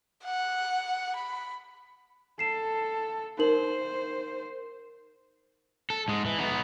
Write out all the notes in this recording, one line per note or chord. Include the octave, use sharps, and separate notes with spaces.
F#5
B5
A4 C7 E7
D#4 A#4 C5 F#7
A4
G#2 G#3
E3
B3 D#4